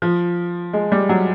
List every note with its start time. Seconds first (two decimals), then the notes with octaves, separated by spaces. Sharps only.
0.02 F3
0.73 G#3
0.92 G3
1.09 F#3